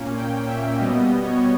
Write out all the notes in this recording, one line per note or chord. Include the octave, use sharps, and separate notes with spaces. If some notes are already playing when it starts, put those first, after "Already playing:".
Already playing: A#2 A#3 C#4
G5
E5
B2 G3 B3 D#5
C#5